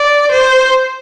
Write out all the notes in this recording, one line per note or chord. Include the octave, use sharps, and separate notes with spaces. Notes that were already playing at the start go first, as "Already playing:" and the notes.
Already playing: D5
C5